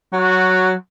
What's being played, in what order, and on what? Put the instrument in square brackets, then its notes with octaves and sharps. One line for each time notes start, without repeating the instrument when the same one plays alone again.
[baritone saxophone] F#3 [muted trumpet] F#4